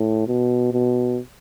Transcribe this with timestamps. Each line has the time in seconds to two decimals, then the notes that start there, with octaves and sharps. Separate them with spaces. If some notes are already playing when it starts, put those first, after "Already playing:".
Already playing: A2
0.27 B2
0.72 B2